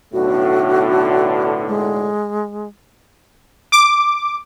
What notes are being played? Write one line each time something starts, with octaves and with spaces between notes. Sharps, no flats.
B1 A2 D3 F#4
G#3
D6